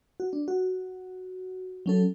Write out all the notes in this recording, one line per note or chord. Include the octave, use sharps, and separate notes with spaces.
F#4
D4
F#4
F#3 C#4 A4